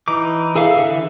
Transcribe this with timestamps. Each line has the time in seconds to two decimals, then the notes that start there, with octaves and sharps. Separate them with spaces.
0.08 E3 D#4 D6
0.56 G#4 A4 E5 F5
0.76 D3 E3 E5